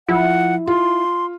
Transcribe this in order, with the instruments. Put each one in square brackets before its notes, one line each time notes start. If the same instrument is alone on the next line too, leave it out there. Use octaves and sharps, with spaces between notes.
[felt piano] F3 [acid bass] E4 [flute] F#5
[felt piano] F4 [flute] C6